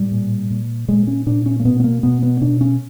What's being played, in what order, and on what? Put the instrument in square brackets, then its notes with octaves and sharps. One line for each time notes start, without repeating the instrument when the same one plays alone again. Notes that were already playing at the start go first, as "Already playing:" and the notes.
Already playing: [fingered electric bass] A2 G3
A#2
A#2
A#2 G#3
C#4
A#2 D4
C#4
A#3
B2 B3
B3
A#3
B2 B3
B3
B2 D4
C#4